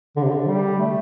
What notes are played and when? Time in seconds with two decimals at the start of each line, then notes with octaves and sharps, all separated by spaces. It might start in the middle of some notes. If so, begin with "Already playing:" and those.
0.16 D3
0.24 C3
0.31 D3
0.47 G3
0.78 A3